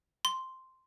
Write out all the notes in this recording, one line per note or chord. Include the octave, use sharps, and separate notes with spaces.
C6